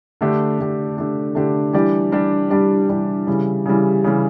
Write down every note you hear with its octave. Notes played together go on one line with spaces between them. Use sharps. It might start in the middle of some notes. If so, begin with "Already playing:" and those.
D3 A3 D4 G4
D3 A3 D4 G4
D3 A3 D4 G4
D3 A3 D4 G4
E3 G3 D4 G4 D5
E3 G3 D4 G4 D5
E3 G3 D4 G4 D5
E3 G3 D4 G4 D5
C#3 E3 G3
C#3 E3 G3
C#3 E3 G3